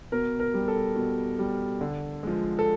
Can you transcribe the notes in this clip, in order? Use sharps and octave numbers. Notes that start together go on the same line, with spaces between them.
B2 A#4
A#4
G3
A4
B2
G3
D3
F3 G#3
A4